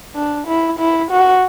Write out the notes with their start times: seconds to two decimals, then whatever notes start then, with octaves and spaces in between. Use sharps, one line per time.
0.15 D4
0.47 E4
0.79 E4
1.11 F#4